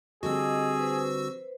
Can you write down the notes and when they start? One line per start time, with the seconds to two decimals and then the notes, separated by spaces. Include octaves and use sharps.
0.23 D3 G3 C4 F#4 G#4 D#5 E6
0.79 B4 C5